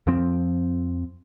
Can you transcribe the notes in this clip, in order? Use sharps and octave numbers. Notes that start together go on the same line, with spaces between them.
F2 F3 C4